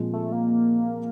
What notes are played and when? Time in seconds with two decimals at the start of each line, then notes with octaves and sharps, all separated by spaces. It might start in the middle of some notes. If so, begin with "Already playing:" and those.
Already playing: A#2 F3 G#3 C4
0.14 A3
0.32 A#3